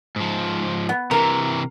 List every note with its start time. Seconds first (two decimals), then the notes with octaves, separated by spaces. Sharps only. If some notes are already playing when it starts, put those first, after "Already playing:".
0.16 G#2 F3
0.89 B3
1.11 C3 E3 A#4